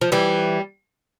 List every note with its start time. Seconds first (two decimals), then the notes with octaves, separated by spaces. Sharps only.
0.01 F3
0.12 E3 G3